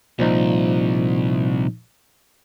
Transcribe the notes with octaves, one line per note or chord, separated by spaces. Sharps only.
C2 A#2 F3 D#4